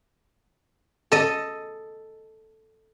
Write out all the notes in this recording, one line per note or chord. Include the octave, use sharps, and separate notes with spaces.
A4 D#5